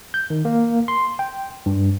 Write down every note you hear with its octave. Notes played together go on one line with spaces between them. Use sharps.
G6
D#3
A#3
C6
G5
G2